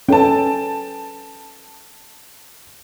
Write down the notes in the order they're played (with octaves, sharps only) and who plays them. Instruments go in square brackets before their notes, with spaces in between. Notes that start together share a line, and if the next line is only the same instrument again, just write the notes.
[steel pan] C#4 A4 B4 [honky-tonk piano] G5 A5